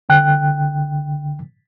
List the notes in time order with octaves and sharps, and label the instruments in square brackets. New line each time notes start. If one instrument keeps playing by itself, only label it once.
[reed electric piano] C2 D3 G5 F#6